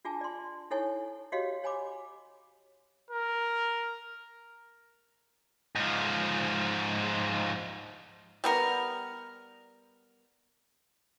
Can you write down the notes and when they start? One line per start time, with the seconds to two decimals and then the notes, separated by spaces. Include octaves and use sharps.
0.05 D4 F4 G#4 G#5 A5
0.21 D5 C6
0.71 D#4 E4 A4 C#5 G#5 C#6
1.32 F#4 G4 C#5 D#5 F5
1.64 C#5 G#5 B5 D6
3.11 A#4
5.76 G#2 F3
8.44 G3 B3 A#4